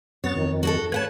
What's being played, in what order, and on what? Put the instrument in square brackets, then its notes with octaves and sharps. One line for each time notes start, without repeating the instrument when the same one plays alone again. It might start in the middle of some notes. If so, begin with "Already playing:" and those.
[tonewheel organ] F#2 B3 A6 [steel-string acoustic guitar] C#5
[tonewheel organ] F2 D#3
[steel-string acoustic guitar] F#4 G#4 A4
[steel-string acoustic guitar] B4 F#5 A5 [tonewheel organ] C#5